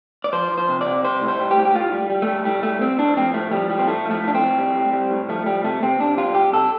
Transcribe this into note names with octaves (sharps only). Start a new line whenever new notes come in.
D5
F3 C5
F3
C5
C3
C3 D5
G3 C5
A2
C5
G3
G4
A2
G4
A2 F4
G3
G3
A3
G3
A2 G3
G3 A3
G3 C4
A2 D4
F3 C4
A2 A3
F3 G3
A2 G3
C4
A2 A3
F3
A3
A2 D4
C4
A2
G3
G3
G3
A2
F3 A3
F3 G3
C3 A3
C3 C4
C3 D4
G3 F4
C3 G4
C3 A4